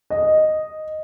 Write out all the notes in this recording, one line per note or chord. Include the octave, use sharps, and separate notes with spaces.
D#5